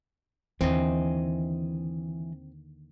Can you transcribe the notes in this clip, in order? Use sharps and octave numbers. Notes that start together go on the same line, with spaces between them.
D#2 D3 E3 C4 D#5